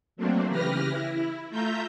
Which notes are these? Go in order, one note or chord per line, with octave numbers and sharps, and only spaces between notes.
F#3 A3 A#3 C4 D4
C#3 E3 G4 B4 F6 A#6
E4
A3 F4 E5 A#5 G6